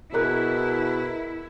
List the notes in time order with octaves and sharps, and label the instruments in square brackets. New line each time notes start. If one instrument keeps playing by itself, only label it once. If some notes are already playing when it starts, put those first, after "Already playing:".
[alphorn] B2 [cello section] E4 [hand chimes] G#4 A#5 F#6 [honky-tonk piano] A#4